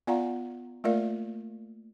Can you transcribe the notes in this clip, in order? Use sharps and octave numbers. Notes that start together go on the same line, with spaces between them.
B3 F4 D5 F5 F#5 A#5
A3 A#3 F4 A#4 D5 F5